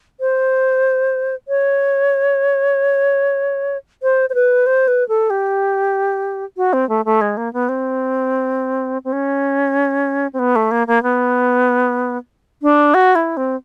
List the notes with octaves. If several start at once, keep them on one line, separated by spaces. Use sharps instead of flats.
C5
C#5
C5
C5
B4
C5
B4
A4
G4
F#4
C4
A3
A3
G#3
A#3
B3
C4
C4
C#4
C4
B3
A3
A#3
A#3
B3
D4
F#4
E4
C4